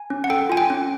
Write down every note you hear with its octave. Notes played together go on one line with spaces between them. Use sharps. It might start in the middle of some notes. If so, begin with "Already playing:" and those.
Already playing: G#5
C#4
F#5
A4 G5
F4 G#5
G5
C#4